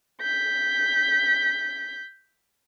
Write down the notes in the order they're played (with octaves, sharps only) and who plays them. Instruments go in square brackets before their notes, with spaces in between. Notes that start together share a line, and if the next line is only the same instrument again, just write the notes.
[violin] G6 B6